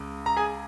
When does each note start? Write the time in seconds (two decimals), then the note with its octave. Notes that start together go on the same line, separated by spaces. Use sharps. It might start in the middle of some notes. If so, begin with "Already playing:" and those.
Already playing: C#2
0.26 A#5
0.36 G#4 G#5